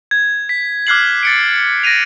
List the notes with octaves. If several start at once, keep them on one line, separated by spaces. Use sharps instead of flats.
G#6
B6
D6 F6 F#6 G#6 C7 F#7
A6 C#7 D7
A6 A#6 D7 D#7 F7